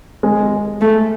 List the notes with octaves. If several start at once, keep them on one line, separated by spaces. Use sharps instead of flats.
G#3
A3